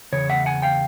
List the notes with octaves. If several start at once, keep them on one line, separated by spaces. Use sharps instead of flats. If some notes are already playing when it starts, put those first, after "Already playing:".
E2 C#3 C#5
E5 F#5
F#5 G#5
F5 G5